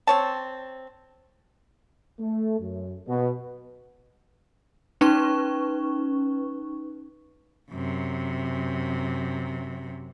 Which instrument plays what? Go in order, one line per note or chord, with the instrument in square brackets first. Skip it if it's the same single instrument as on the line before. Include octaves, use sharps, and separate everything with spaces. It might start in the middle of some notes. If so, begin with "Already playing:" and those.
[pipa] C4 C#5 A5
[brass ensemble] A3
F#2
B2
[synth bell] C#4 D#4 B4 C#6
[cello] F#2 C3